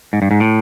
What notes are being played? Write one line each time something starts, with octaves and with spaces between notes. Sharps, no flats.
G#2
G2
G#2
A2